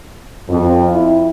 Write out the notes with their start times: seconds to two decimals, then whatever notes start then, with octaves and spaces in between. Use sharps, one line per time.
0.50 F2
0.92 E4